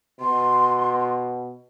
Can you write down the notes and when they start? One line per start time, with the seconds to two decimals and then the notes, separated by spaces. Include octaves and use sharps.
0.20 B2 C6